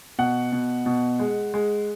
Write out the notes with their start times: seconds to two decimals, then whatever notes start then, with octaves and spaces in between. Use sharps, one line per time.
0.19 B2 F#5
0.52 B2
0.86 B2
1.20 G#3
1.54 G#3